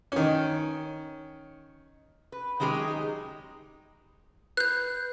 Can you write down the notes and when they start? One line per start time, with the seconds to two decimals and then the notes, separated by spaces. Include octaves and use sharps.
0.12 D#3 C#4
2.32 B4
2.60 D#3 F#3 G#3 G4 G#4
2.88 D#4
4.57 B4 F#6 G6